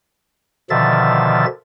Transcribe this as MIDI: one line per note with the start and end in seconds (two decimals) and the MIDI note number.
0.70 1.46 47
0.70 1.46 50
0.70 1.46 51
0.70 1.46 53
0.70 1.46 76
0.70 1.46 93